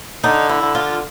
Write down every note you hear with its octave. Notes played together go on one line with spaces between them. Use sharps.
D3 D#4
E4
D3
F4